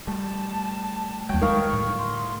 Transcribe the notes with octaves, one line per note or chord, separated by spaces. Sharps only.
G3 A3 A5
D#2 F#3 G3 G5
D#3 G#3 F5 C#6
A2 D3 G3
C6